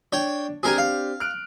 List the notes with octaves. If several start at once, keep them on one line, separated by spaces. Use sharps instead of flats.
D4 C#5 G5
C4 D4 G4 G#4 A#4 G#5
F5
F6 F#6 D7